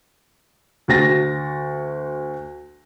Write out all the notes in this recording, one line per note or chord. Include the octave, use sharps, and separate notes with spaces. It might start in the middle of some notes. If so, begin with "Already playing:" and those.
D2 F#4 A6 A#6